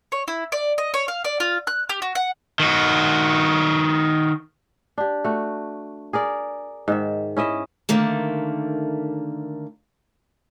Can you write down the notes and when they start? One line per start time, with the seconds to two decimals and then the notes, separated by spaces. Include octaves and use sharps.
0.12 C#5
0.28 E4
0.52 D5
0.78 D#5
0.94 C#5
1.08 F5
1.24 D5
1.40 F4
1.67 F#6
1.89 G4
2.02 F#4
2.15 F#5
2.60 D#3 F#4
4.98 D4 G4
5.24 A3 F#4
6.13 G#4 A#4 D5
6.88 G#2 D#3 E5
7.37 C#4 E4 D#5 E5
7.89 D3 D#3 A3 A#3